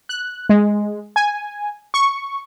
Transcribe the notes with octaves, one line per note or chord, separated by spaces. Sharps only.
F#6
G#3
G#5
C#6